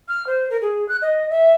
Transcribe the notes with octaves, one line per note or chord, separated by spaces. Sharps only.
F6
C5
A#4
G#4
F#6
D#5
E5